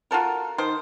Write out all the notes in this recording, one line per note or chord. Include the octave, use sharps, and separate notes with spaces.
F4 F#4 A4 A#4
D#3 C5